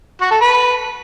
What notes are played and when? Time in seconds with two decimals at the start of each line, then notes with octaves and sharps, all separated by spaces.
0.21 F#4
0.31 A4
0.41 B4